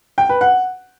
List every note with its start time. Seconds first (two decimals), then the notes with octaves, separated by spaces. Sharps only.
0.18 G5
0.29 B4
0.41 F#5